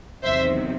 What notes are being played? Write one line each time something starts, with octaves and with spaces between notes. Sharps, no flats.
E2 C3 D#3 F#3 C5 E5